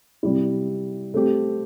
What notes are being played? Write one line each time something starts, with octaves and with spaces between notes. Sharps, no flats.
C3 G3 E4
A3 C4 G4